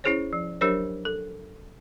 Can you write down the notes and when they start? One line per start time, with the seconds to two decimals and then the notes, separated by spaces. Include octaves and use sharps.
0.04 C#4 E4 G#4 C5 C#5
0.33 F3
0.61 F#3 D4 G4 A#4 C5 C#5
1.05 A4